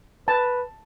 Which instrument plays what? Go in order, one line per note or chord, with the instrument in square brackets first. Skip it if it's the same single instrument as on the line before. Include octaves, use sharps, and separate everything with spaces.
[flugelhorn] B4 [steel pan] A5